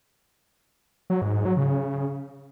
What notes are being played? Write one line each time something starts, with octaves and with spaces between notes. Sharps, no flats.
F#3
G#2
G#2
F#3
C#3